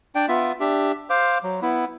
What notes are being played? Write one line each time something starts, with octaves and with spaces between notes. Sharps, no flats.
D4 D5 G5
B3 F4 E5
D4 G4 E5
C5 F5 D6
F#3
B3 E4